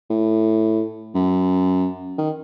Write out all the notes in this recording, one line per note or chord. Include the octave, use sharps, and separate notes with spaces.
A2
F#2
D#3